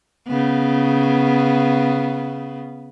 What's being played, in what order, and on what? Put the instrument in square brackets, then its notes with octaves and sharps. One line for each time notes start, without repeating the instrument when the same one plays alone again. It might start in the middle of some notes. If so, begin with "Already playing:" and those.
[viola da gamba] C#3 B3